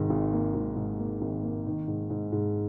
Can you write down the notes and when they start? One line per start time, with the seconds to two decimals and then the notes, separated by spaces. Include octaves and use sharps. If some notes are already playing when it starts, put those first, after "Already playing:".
Already playing: G#1 G#2 D#3
0.10 G#1
0.32 A#3
0.54 G#1
0.76 G#2
0.99 A#3
1.22 G#1
1.43 A#3
1.66 D#3
1.87 G#2
2.10 G#2
2.32 G#2